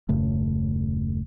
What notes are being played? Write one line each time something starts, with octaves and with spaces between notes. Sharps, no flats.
D#1 F#2 C#3 A3